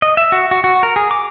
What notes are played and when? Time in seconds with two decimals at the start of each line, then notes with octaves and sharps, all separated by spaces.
0.02 D#5
0.17 E5
0.32 F#4
0.51 F#4
0.64 F#4
0.83 A#4
0.96 G#4
1.11 D6